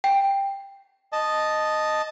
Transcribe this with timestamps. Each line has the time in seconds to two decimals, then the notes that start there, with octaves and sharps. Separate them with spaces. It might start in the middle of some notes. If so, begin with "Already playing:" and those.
0.04 G5
1.13 D#5 A5